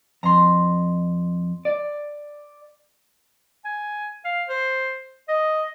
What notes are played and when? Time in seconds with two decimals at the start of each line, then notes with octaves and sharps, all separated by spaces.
0.23 F2 A#5 C6
1.65 D5
3.65 G#5
4.25 F5
4.48 C5
5.29 D#5